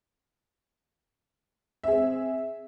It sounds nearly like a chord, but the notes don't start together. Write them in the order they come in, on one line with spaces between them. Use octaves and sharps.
E5 G#4 C4